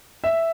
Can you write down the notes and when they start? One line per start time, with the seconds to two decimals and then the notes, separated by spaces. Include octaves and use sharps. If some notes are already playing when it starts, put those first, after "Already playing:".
0.24 E5